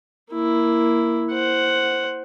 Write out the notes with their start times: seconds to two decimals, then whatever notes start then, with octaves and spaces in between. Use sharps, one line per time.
0.33 A#3 E4
1.33 C5 F#5